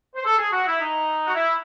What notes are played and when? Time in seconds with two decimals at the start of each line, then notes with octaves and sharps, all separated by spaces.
0.15 C5
0.25 A4
0.38 G#4
0.52 F#4
0.67 E4
0.80 D#4
1.26 F#4
1.35 E4